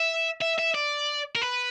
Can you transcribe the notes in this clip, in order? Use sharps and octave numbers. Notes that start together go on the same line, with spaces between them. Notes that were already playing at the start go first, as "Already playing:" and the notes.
Already playing: E5
E5
E5
D5
A#4
B4